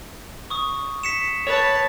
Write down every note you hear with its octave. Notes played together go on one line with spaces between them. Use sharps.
C#6 D#6
B6 C#7 E7
B4 C#5 A5